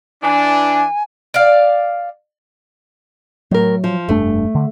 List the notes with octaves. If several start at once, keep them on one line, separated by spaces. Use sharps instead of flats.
E3 D4 G#5
D5 F5
A2 F#3 A#4
F3
F1 G2 A3 D4
D3